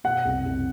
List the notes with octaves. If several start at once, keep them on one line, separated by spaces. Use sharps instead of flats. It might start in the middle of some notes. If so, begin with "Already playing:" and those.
B2 F#5
C2
C2